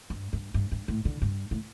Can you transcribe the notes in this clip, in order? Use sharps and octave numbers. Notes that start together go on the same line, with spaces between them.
G2
G2
G2
G2
A2
D3
G2
A2